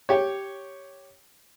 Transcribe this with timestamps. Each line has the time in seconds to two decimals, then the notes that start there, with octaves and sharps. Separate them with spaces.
0.09 G4 C#5